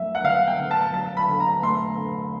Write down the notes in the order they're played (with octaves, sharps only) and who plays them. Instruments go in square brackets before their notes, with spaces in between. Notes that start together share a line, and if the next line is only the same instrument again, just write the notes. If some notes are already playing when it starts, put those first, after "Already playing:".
Already playing: [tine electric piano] F#3 A3 [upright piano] E5
[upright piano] F#5
[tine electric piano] D3 [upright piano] F5
[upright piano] G5
[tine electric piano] D3
[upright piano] A5
[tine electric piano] F#3 [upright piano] A5
[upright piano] B5
[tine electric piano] D3
[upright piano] A#5
[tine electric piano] A3 [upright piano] C6
[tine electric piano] D3